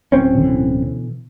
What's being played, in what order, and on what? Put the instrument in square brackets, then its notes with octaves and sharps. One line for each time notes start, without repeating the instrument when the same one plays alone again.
[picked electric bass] D1 C4 C#4
[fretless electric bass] B2 D3 E3